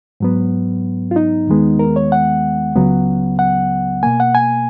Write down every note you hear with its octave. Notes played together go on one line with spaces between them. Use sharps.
G#2 F#3 B3
F4
D#4
D#2 D#3 G#3 B3
A#4
C#5
F#5
C#2 C#3 F#3 B3
F#5
B2 A#3 G#5
F#5
G#5